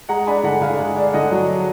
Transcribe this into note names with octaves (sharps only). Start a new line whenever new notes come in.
G#3 F#5 A#5
D4 G#5 B5
D3 F#5 A#5
D3 F5 G#5
G#3
D4
D3 D#5 F#5
F#3